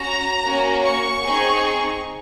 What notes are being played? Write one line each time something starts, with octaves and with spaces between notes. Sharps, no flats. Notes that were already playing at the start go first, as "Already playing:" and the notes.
Already playing: C#4 F#4 A#5
A#3 C#4 F#4
C#6
C4 D#4 G#4